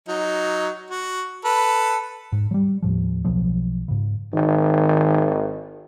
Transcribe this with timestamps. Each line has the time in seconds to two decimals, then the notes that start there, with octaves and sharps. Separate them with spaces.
0.08 F#3 D#4
0.90 F#4
1.45 A4 B4
2.32 G#2
2.51 F#3 G3
2.82 D#2 A2 F3
3.25 B1 B2 F3 F#3
3.88 G#2 C#3
4.33 G#1 D#3